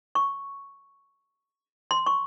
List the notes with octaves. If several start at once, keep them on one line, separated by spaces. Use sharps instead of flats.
C#6
C6
C#6